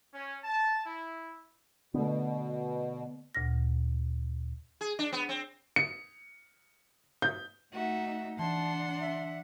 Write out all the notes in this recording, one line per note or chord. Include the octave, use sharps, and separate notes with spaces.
C#4
A5
E4
B2 D3 A3 B3
D2 A#2 F6 A#6
G#4
D4
B3
C4
C#7
G6
A3 D#4 F#4 E5
E3 D4 F#5 A5 C6
E5